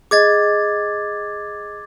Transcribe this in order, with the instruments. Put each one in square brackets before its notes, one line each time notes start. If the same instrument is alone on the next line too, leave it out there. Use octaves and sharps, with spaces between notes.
[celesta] G#4 D#5 [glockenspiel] D6 G#6 A6